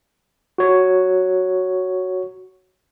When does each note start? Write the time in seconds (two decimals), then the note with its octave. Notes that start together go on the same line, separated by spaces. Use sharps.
0.58 F#4 C#5